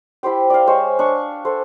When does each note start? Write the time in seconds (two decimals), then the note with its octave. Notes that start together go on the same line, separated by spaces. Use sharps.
0.23 E4 G4 C5 G5
0.50 D5 F5
0.67 G#3 C5 C#5
0.99 D4 C#6
1.45 A4 C5